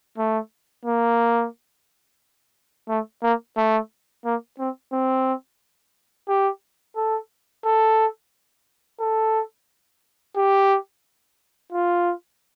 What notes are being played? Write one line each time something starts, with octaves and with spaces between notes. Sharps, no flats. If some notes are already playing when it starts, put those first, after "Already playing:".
A3
A#3
A3
A#3
A3
A#3
C4
C4
G4
A4
A4
A4
G4
F4